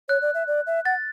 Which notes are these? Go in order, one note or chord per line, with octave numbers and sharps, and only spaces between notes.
C#5 F#6
D5
E5
D5
E5
F#5 A6